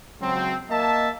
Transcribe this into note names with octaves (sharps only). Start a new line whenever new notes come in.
C#2 F#3 C4
A#3 D#5 E5 A5